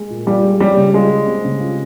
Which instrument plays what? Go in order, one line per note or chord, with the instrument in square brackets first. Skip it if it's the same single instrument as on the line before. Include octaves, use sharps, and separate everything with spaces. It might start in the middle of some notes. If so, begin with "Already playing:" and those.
Already playing: [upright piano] G#3
A#2
[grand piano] G3 [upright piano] F4
[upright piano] G#3
[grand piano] G3 [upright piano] C#4
[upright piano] C#3
[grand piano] G#3 [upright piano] F4
[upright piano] G3
C4
C#3
F4